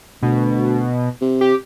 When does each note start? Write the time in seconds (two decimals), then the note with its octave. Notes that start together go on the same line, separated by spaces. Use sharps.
0.23 D2 B2
1.21 C3
1.41 G4